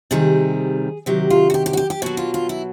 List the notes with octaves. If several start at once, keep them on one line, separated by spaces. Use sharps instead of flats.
C3 D#3 G3 G#4
C3 D#3 F#3 G4
F4
F#4
G4
G4
F#4
G4
G4
B2 F#3 F#4
F4
F4
E4